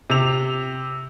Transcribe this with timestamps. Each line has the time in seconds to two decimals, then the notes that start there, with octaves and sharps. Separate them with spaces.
0.10 C3 F7